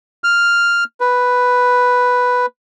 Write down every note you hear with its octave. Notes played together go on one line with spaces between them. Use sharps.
F6
B4